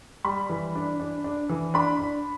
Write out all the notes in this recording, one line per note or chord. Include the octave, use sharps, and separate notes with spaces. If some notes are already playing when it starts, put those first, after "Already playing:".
G3 B5
E3
D4
D4
D4
E3
D4 B5
D4